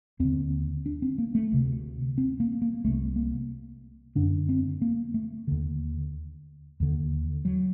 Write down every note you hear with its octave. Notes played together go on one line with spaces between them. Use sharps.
D#2 D3 C4
D4
C4
A#3
A3
D2 C3
C4
A#3
A#3
C2 C3 A3
A#3
F#2 D3 D4
C4
A#3
A3
D#2 D3
D#2 D3
F#3